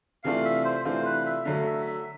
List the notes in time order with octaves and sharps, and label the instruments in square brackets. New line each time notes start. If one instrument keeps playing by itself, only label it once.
[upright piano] C3 E3 A3 D4 F4 [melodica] F5
[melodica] E5
C5
[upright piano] C3 E3 A3 D4 F4 [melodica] C5
[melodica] B4
E5
[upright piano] D3 F#3 A3 [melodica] F5
[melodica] E5
E5